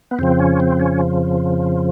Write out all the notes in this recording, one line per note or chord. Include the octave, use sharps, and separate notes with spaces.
B3
F2 C#3 F3 C4
C#4
C4
C#4